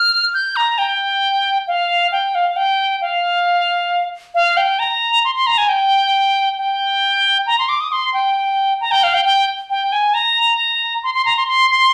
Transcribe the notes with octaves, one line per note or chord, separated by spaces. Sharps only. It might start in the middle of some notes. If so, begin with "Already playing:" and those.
Already playing: F6
G6
A#5
G5
F5
G5
F5
G5
F5
F5
G5
A#5
C6
C6
A#5
G#5
G5
G5
A#5
C6
D6
D#6
C6
G5
A#5
G5
F5
G5
G5
G5
G#5
A#5
C6
C6
A#5
C6
C6
C6